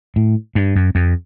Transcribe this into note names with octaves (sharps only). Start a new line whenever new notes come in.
A2
G2
F#2
F2